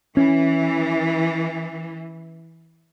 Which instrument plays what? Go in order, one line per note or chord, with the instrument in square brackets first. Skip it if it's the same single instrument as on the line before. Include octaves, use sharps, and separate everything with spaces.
[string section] E3 [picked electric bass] C#4